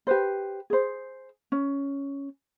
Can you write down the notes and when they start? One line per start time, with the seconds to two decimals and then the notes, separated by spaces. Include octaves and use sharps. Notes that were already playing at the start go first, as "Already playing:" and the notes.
0.07 G4 B4 C5
0.70 G#4 C5
1.52 C#4